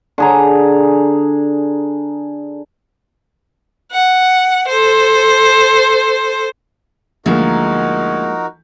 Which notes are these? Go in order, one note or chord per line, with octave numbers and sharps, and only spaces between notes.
D3 G#4 A#5
F#5
A4 C5
D2 F3 G#3 A#3 D#4 F#4 A#4